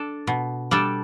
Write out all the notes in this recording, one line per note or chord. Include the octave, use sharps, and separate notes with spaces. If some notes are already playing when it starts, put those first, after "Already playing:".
Already playing: D4 A4
B2
G3 D4 A4